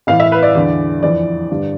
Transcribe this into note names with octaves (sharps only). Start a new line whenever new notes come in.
A2 E3 F5
E5
B4
D5
E2 D3
F2 E3 D5
G2 D3